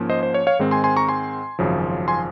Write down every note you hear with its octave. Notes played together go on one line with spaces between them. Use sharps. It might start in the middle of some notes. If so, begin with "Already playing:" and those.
Already playing: G#2 F3 A#3 C#4
C5 D#5
C5
C#5
C#5 F5
G#2 D#3 G#3 C4
G#5 C6
G#5 C6
A#5 C#6
G#5 C6
G#1 F#2 C#3 F3
G#5 C6